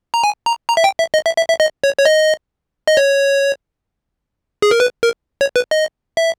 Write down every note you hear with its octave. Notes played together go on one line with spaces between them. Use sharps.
A#5
G#5
A#5
A#5
E5
G5
E5
D#5
E5
E5
E5
D#5
C#5
C#5
D#5
D#5
C#5
G#4
A#4
B4
A#4
C#5
B4
D#5
E5